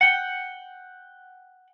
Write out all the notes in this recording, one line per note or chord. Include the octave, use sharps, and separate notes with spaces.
F#5 G5